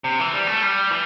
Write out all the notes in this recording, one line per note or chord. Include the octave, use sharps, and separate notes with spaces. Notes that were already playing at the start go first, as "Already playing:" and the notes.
C3
E3
G3
A3
G3
E3